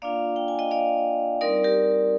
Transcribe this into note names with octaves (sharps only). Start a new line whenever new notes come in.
A#3 D4 F4 D5 F5
G5
G#5
D#5 G5
D5 F5
G3 C4 D#4 A#4 D5
G4 A#4